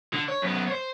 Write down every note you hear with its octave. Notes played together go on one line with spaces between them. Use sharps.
D3
C#5
F#2 B3
C5 C#5